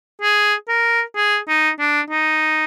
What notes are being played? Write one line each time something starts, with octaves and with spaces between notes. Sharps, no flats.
G#4
A#4
G#4
D#4
D4
D#4